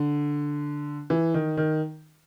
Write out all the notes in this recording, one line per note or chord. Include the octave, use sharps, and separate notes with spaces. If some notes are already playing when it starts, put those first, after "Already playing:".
Already playing: D3
E3
D#3
D#3